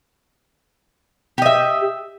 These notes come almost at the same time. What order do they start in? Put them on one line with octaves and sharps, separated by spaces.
G4 D#5 E5